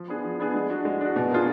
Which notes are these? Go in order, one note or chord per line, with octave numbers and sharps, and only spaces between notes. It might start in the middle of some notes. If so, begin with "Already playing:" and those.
Already playing: F3
B3 D4 G#4
F3
B3 D4 G#4
G#3
D4 F#4
G#3
D4 F#4
B2
A#3 D4 F4 G#4